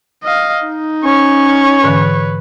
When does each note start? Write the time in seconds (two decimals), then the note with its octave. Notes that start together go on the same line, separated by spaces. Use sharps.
0.23 D#5 F5
0.67 D#4
1.04 C#4 C#5
1.84 G#2 D3 E3 B4